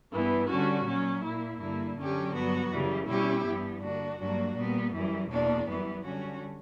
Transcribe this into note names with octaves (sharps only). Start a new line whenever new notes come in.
G2 E3 B3
D3 G3 C#4 F#4
A#2 F#3 C#4
A#2 A#3 E4
G2 D3 A#3 E4
F#2 D3 F#3 C#4 G4
G2 F#3 B3 F#4
F#2 C#3 E3 G3
B2 G3 C#4 E4 G4
G2 E3 B3
D3 A#3 D4 F#4
G2 F#3 A#3 D4 F#4
A#2 G3 B3
F#2 E3 G3
E2 B2 A#3 D4
F#2 E3 G3 B3
D3 G3 C#4 F#4